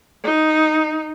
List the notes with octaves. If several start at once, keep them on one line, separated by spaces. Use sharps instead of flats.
D#4